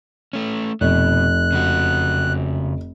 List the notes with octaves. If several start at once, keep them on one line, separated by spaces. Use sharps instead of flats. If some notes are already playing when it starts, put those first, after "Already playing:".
A3 C#4
F1 B2 F#6
C#3 F#4